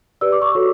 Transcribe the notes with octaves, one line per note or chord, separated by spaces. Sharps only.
G4 B4 D5 E6
D6
C#6
F#4 A4 C#5 D6